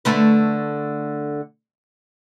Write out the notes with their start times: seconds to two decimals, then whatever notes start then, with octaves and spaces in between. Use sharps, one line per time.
0.05 D3 A3 B4